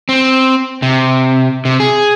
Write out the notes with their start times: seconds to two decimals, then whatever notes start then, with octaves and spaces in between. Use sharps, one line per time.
0.09 C4
0.82 C3
1.65 C3
1.80 G#4